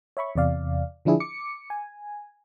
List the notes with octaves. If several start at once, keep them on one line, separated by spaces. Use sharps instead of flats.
C#5 E5 B5 C#6
E2 C3 D5 F5
D3 F3 D4 E4 G#4
D6 C#7
G#5